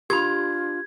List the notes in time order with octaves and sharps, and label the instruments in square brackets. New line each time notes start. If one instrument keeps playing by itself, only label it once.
[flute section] D4 F4 [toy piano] G4 B5 [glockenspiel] G#6